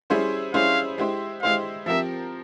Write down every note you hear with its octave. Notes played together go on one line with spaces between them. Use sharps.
G3 C#4 E4 G#4 C5
G3 C#4 E4 G#4 C5 F5
G#3 E4 G4 C5
G#3 E4 G4 C5 F5
F3 C4 G4 A#4 E5